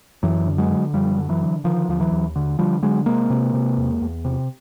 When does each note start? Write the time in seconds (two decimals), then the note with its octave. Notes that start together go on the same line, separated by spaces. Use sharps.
0.23 F#2 E3 F#3
0.46 D3
0.58 F#3 G#3
0.70 D3
0.93 F#2 F3 G3
1.18 D3
1.29 E3 F#3
1.41 D3
1.64 D3 D#3 F3
1.89 D#2 F3
2.00 E3 F#3
2.12 D#2
2.36 D3
2.59 D3 F3 G3
2.83 D3 F#3 G#3
3.06 C3 G#3 A#3
3.30 C3
3.54 C3
3.78 E2
4.01 E2
4.25 C3